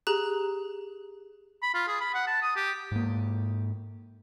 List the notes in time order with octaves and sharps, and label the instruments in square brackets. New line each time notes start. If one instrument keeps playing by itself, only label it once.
[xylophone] G4 G#4 A#5 F#6
[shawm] B5
F4
G#4
B5
F#5
A5
D#6
G4
[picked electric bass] G#2 A#3